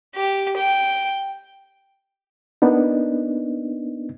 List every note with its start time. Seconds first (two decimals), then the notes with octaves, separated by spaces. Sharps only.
0.15 G4
0.57 G5
2.62 A#3 B3 D4 D#4